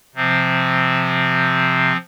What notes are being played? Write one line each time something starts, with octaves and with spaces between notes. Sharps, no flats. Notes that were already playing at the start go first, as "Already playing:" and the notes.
C3 F3 C4